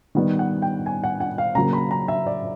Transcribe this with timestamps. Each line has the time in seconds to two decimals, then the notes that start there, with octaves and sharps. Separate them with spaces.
0.15 D#3 G3 B3
0.39 F#5
0.62 G5
0.86 G#5
1.04 F#5
1.20 F#5
1.38 F5
1.55 C#3 F#3 A#3 A#5
1.73 B5
1.91 A#5
2.08 E5
2.27 D5